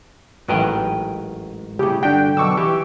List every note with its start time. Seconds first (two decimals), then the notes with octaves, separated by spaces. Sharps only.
0.48 A1 G#2 D#3 F#3 B4 G5
1.79 C2 A2 C#3 G4
2.03 G2 D3 D4 F#4 G4 G5
2.37 F#2 B2 D3 C#6 D6 E6
2.57 E3 G4